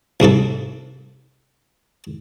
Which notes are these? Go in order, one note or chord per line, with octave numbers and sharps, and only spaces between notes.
C2 G#2 C3 A4